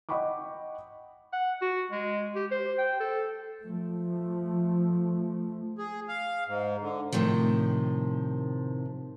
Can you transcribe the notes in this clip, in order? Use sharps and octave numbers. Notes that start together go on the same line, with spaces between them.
D#5 F#5 G5 B5 C#6 D6
F#5
F#4
G#3
G4
C5
G5
A4
F3 A3
G#4
F5
G#2
D3
A2 C3 D#3 F3